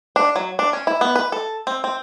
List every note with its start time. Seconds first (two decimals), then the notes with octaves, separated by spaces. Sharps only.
0.16 D4
0.36 F#3
0.59 D4
0.73 C#4
0.87 E4
1.01 B3
1.16 B4
1.32 A4
1.67 C4
1.84 C4